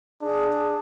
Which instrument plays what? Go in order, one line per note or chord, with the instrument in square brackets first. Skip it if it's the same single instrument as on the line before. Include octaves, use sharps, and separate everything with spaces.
[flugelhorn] D4 [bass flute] G#4
[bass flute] G#4